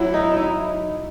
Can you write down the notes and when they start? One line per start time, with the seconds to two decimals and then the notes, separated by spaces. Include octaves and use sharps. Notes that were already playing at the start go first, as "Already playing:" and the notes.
Already playing: F#3 E4
0.14 D#4
0.37 D#4